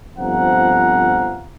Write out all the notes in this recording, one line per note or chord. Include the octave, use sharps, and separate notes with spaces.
G1 F3 C4 F5 F#5 A#5